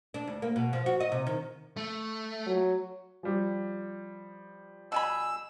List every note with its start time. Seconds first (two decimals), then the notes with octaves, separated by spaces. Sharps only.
0.14 D4
0.27 D2
0.42 A#3
0.56 B2
0.73 F3
0.86 F#4
1.00 D#5
1.12 C3
1.27 D#3
1.77 A3
2.46 F#3
3.23 F3 G3
4.92 B2 G#4 B5 E6